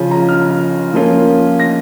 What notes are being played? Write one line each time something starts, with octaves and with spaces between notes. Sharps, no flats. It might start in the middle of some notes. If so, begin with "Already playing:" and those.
Already playing: C#3 F3 C#4 F4
A#5
F6
F3 A#3 C#4 F4
A#6